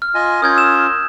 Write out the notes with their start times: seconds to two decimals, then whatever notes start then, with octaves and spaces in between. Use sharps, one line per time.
0.02 F6
0.15 F4 D#5 G#5
0.42 C#4 F4 A#4 D#6 G6 G#6
0.55 D#6 E6 E7